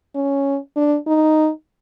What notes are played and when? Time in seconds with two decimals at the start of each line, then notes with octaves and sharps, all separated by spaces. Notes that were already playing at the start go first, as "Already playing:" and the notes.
0.15 C#4
0.76 D4
1.07 D#4